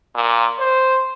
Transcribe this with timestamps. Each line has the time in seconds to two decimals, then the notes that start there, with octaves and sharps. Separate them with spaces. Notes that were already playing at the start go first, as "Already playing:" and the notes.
0.15 A#2
0.59 C5